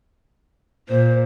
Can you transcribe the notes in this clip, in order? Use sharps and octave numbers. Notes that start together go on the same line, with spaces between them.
A#2 C5